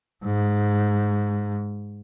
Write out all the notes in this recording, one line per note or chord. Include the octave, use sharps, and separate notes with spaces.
G#2